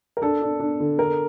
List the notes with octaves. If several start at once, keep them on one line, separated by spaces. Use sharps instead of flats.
A#4
D4 A4
D4
D4
D3
D3 A#4